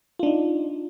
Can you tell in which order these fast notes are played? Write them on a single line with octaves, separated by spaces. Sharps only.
F4 D4 D#4